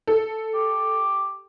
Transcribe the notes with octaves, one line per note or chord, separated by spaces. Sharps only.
A4
G4